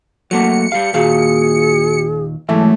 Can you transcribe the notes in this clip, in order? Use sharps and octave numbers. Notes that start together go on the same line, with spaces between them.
F#3 A3 A#3 F#5 C#7
G3 G4 F5
D#2 A#2 F#4 G#4 F5
G#2 E3 F#3 A3